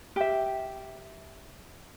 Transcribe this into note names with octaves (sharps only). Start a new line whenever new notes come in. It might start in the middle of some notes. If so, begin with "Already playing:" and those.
G4 E5